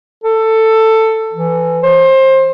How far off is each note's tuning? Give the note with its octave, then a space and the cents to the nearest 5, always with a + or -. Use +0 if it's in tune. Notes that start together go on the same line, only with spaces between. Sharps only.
A4 +15
E3 +20
C5 +25